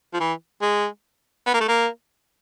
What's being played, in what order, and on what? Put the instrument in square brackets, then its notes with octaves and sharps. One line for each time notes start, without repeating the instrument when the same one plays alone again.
[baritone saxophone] F3
E3
G#3
B3
A#3
A3
A#3